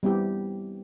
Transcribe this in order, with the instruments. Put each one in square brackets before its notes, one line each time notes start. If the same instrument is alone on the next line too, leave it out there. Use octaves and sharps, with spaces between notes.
[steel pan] G3 B3 C4 E4 G4